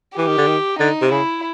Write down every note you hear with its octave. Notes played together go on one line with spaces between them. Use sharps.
E3 G4
D#3
D3
D#3
D3 D#4
C3
C#3 E4